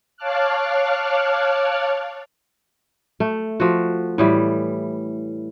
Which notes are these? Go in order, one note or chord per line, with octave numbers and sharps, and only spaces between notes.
C#5 F5 A5 D6 F6 F#6
A3
F3 F#4
A2 E3 G3